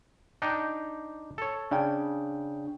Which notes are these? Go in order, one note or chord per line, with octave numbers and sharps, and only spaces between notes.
D4 D#4 G5
A4 C#5
C#3 D4 G5